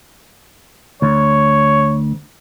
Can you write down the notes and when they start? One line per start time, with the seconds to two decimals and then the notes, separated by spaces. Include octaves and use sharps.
1.02 D2 C#5